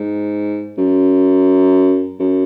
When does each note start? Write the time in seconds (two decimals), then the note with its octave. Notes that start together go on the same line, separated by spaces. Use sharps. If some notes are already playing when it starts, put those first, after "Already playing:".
Already playing: G#2
0.78 F#2
2.20 F#2